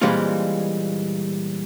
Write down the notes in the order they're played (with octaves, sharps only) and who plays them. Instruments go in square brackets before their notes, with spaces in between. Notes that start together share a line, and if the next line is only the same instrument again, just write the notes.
[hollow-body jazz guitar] A#2 E3 G3 G#3 C4 F4